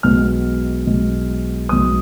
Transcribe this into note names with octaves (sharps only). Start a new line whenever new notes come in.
B1 B2 G#3 B3 F6
B1 B2 G#3 B3
B1 B2 G#3 B3 D#6